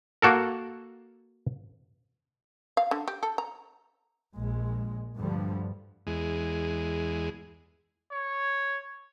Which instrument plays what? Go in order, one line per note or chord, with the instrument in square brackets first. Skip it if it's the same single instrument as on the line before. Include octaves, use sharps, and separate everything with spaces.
[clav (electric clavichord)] A#3 F#4 A4 A#4
[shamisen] F5
D3
G4
A4
A#5
[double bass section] A#1 A#2 G#3
D2 G2 D3 F3 G3
[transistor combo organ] E2 G#3
[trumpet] C#5